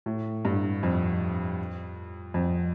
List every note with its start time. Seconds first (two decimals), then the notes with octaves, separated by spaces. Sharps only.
0.06 A2
0.45 G2
0.83 F2
2.34 F2